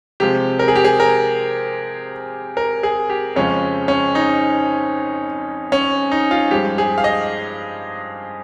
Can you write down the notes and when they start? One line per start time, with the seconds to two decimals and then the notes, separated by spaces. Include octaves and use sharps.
0.20 C3 F3 G#3 G4
0.59 A#4
0.68 G#4
0.76 G4
0.85 G#4
1.00 A#4
2.57 A#4
2.83 G#4
3.10 G4
3.36 F2 C#3 F3 G#3 C#4
3.88 C#4
4.15 D#4
5.72 C#4
6.12 D#4
6.31 F4
6.51 G2 F3 G#3 G4
6.78 G#4
6.98 F5
7.04 D#5